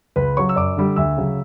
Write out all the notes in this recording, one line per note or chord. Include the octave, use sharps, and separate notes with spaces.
C#2 B4 B5
C#3 F#3 C#5 C#6
E6
F#2 D5 D6
D3 G3
D2 E5 E6
C#3 F#3